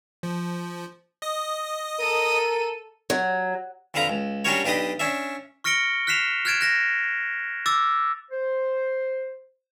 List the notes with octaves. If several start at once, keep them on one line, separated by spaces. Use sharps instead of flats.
F3
D#5 D#6
A4 A#4 D#7
F#3
F2 D3 B4 F5 A#5
C#2
G3 C#4 D4 F#4 A#4 C#5
B1 D4 G4 B4 D#5 D#6
C#4 D4 E5
C#6 F6 A#6 C#7 D7 G7
F6 F#6 B6 C7 E7 F7
F6 F#6 G#6 A6 D7 E7
F#6 A#6 E7
D6 E6 A6
C5